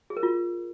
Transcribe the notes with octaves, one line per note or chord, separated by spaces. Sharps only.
G#4
A#4
F4